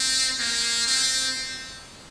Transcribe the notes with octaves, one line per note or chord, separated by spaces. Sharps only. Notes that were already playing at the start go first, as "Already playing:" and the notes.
Already playing: C4
A#3
C4